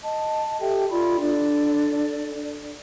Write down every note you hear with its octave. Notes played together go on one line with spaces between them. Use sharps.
D#5 A5
G4 A4 E5 G5
F4 D5 B5 C6
D4 A4 D5